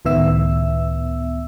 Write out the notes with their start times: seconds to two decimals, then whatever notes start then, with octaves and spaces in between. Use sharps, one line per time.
0.05 C#2 A2 D#3 B3 E5 E6